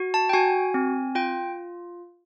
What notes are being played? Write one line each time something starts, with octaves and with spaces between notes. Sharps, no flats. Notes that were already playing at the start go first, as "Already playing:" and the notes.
Already playing: F#4
A5
G5
F#4 G#5
C4
F4 G5